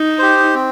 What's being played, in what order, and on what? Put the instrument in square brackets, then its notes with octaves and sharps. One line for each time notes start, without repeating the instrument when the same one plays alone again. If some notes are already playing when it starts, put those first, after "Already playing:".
Already playing: [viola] D#4
[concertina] G4 C5
C4